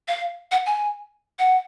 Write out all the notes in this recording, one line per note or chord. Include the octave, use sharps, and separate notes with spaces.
F5
F#5
G#5
F#5